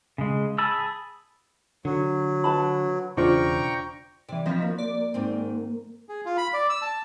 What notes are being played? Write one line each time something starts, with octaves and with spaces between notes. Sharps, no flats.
C#3 G#3
G#4 A5 B5 E6
D3 F#3
B4 A5 B5
E1 C#3 D4 F4 C5 G5 A#5 C#6
C3 E3 D5
D#3 F3 C4 D#5 F5 B5
A#3 F#4
D5
G#2 D#3 C4
G#4
F4
B5
D5
E6
A5